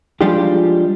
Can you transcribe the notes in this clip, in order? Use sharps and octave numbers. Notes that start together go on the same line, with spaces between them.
F3 G3 G#3 D4 F4 G4